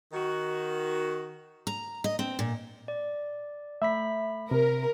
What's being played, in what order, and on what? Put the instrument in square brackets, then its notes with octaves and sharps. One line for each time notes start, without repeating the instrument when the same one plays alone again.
[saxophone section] D#3 F#4
[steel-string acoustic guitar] A#5
D#5
C4
A#2
[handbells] D5
[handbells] A3 B5 B6 [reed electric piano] E5
[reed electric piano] C3 [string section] A#4